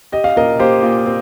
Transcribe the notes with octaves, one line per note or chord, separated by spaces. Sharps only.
G4 D#5
F5
A#2 A#4 D#5
A#3 G4 C5
A#2
C4